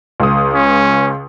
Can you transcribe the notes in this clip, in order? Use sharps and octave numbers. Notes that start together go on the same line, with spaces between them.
C#2 D#6
C#4